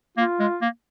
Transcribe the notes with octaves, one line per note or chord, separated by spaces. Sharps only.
A#3 F4
G#3
A#3